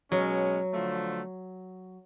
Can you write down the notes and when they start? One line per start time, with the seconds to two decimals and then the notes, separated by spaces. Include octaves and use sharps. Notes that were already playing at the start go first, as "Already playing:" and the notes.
0.11 B2 F#3 G#3 C#4
0.73 D3 F3 A3